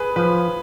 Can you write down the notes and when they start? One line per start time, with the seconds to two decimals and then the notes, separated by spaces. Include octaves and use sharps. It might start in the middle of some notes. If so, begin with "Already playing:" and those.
Already playing: G#4 B4
0.16 F3 B4